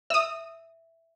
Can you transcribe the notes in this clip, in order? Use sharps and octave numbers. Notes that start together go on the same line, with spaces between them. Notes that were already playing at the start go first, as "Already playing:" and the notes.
E5 D#6 E6